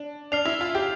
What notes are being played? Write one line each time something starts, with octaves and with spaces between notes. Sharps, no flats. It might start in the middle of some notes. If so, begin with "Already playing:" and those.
Already playing: D4
D4 F6 C7 F7
E4
F4
G4